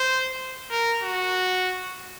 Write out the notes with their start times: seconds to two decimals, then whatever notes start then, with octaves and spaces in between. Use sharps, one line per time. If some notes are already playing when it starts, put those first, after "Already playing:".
Already playing: C5
0.71 A#4
1.03 F#4